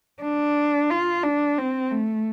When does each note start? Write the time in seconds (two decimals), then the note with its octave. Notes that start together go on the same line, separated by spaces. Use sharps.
0.22 D4
0.90 F4
1.24 D4
1.58 C4
1.91 A3